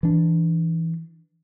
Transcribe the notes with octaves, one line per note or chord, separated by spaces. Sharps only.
E3 D4